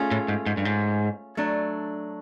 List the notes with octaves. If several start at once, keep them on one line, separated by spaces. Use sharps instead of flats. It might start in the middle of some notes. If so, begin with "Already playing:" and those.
Already playing: A3 C#4 F4 G#4
A2
G#2
G#2
G2
G#2
F#3 A3 D4